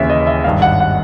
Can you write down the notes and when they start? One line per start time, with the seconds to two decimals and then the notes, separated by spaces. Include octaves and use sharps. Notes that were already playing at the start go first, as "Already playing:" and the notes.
Already playing: D#2 C#3 E3 E5
0.10 D#5
0.27 E5
0.44 G#1 G2 D#3 F5
0.62 F#5
0.80 F#5